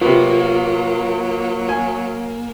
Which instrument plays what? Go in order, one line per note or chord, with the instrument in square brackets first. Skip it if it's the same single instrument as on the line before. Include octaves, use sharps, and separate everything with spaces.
[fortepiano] C3 B3 [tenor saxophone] F#3 [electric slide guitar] A#3 [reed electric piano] F4
[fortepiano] G#5